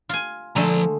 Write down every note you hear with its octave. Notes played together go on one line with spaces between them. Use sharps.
F4 G#5
D3 F3 G#3 A3 A#5